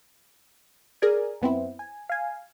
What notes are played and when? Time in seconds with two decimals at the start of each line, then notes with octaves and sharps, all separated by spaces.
1.02 G#4 A#4 D5 G#5
1.41 F#2 B3 C4 E4
1.79 G#5
2.09 F5 G#5